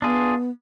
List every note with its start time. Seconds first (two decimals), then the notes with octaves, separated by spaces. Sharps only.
0.02 B3 D4 F4 G#4